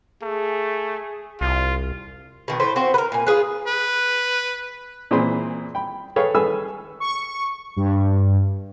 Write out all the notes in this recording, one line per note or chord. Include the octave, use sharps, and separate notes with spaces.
A3 G#4
C2 F4
B2 D#3
A2 B4 C5
C4 F#4 C5
A#4 B4
A#2 G#5
F4 G#4 B4
B4
A#2 E3 C4 G#4 C5 B5
G5 B5
G#4 A4 B4 C#5 F5 G5
G#4 A4 B4 G#5 B5 E6
C#6
G2